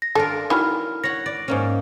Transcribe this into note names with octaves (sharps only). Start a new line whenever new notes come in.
A#6
D4 F4 A4 A#4
D#3 E3 F#3 B5 F6
C#5 F#5 A#6
D5
G#2 A#3 C#4